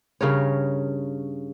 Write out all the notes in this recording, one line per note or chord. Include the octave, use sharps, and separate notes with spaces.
G2 C#3 A#4 C#5